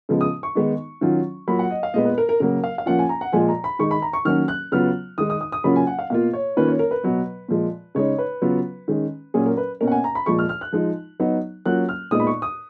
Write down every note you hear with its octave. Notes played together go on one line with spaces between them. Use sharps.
C#3 F3 G#3 B3
D#6
C#6
D#3 G#3 B3 D#4
D#3 F#3 C#4 F4
F#3 A#3 F4 B5
F#5
D#5
F5
A#2 G#3 B3 D#5
B4
A#4
A#4
C#3 F#3 A#3 A#4
F5
F5
F3 A#3 C#4 F4 F#5
G#5
A#5
F#5
A#2 F3 G#3 G#5
A#5
B5
D#3 G#3 D#4 C#6
B5
A#5
C#6
D#3 F#3 A#3 C#4 F6
F#6
C#3 F#3 B3 F4 F6
D#3 G#3 D#4 D#6
D#6
D#6
D#6
C#3 F#3 A#3 C#4 F4 B5
G#5
F#5
F5
B2 A#3 F4 F5
C#5
D#3 A#3 C#4 F4 B4
C#5
A#4
B4
B2 F#3 B3
A#2 F3 G#3
C#3 G#3 D#4 C#5
B4
C#3 F#3 B3 F4
D#3 G#3 C#4
A#2 F#3 C#4 G#4
A#4
B4
B2 A#3 C#4 A#4
F#5
G#5
A#5
B5
A#2 F3 G#3 C#6
F6
F6
F#6
F3 G#3 D#4
F#3 B3 D#4
F#3 A#3 C#4 F4 F#6
F6
A#2 G#3 B3 D#4 D#6
B5
C#6
D#6